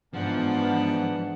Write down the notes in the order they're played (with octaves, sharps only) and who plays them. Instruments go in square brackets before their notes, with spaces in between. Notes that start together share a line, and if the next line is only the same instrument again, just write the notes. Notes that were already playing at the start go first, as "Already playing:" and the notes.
[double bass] G#2 E3 [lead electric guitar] F3 [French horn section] B3 [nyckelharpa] D4 F#5